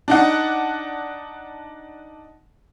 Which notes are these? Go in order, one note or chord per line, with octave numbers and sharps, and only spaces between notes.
D4 D#4 F#5